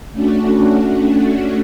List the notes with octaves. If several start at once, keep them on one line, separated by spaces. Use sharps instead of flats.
A3 C#4 D4 F#4